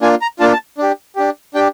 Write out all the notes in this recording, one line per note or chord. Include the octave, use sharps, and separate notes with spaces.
A#3 D4 F4 G#5
A#5
A#3 D4 F4 A5
A5
D4 G4
D4 G4
D4 G4 G5